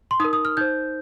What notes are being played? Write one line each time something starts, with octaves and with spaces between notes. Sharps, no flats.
C6
D#4 A#4 D#6
D#6
F6
D#4 C5 G6